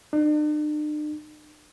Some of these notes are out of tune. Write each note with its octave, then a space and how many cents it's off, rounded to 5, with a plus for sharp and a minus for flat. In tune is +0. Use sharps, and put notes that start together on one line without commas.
D4 +45